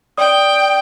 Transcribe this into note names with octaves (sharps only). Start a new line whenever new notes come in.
D5 G5 D#6